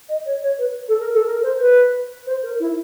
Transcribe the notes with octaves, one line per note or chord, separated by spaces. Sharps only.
D#5
C#5
C#5
B4
A4
A#4
A4
A#4
C5
B4
C5
A#4
E4